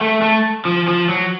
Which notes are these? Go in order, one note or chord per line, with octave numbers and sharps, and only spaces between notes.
A3
A3
F3
F3
F#3